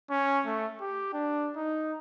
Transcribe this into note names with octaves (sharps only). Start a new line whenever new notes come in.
C#4
A3
G4
D4
D#4